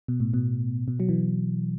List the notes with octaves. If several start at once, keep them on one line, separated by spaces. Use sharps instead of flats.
B2
A2
B2
B2
F#3
E3